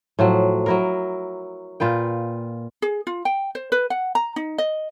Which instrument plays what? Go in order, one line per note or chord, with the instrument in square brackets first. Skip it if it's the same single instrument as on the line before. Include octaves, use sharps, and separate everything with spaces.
[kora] A2 F3 F#3
F#3 E4 A#4
A#2 F4 B4 G5
[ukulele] G#4
F4
G5
C5
B4
F#5
A#5
D#4
D#5